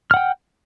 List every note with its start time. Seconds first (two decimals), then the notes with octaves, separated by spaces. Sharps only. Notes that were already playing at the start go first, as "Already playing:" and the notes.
0.11 F6
0.14 F#5
0.17 G5